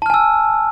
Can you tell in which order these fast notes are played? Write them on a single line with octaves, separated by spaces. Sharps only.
A5 F6 G#5 E6